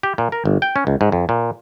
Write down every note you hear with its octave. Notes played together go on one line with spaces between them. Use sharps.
G4
A#2
A#4
G1
G5
C#4
C#2
G#2
F2
A#2